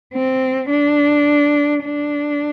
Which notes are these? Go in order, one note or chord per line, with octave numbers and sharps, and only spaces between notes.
C4
D4
D4